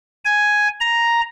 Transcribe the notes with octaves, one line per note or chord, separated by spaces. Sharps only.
G#5
A#5